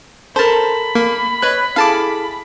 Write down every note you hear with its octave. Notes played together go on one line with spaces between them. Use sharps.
A4 A#4 C5 A5 B5
A#3
B4 C#5 D#5 F#6
E4 G#4 A4 F5 A5 D6